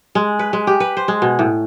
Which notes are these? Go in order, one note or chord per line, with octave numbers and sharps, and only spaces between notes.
G#3
B4
G#3
G4
B4
C5
G#3
B2
A2